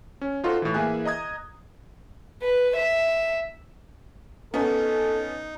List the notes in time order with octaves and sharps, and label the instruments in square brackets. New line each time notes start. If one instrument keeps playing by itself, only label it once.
[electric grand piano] C#4
D#4 F4 F#4 A4 C5
A2 E3
E3 A#3 G#4 E5 G#5 F#6
D#5 A#5 D#6 G#6
[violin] B4
E5
[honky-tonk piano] B3 C#4 [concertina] D#4 [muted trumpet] A4